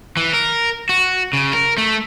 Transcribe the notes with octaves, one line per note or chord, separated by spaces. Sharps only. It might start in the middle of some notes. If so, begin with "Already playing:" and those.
E3
A#4
F#4
C#3
A#4
A3